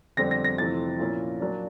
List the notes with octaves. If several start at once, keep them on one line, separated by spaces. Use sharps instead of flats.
F2 D3 G3 C4 A#6
A#6
A#6
F2 C3 E3 A3 C4 A6
A#2 F3 A#3 C#4 E4
A#2 F#3 A#3 D4